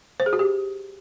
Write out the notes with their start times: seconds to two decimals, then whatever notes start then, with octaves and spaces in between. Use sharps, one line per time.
0.20 C5
0.26 G#4
0.33 F#4
0.39 G4